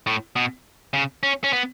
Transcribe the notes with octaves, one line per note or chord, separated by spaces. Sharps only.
A2
B2
C#3
C#4
C#4
B3